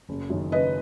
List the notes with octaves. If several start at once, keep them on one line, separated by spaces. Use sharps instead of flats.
F#1
F#2 D#3
F#1 B4 D#5